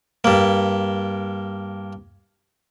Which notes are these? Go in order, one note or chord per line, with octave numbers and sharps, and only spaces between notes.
G2 A#3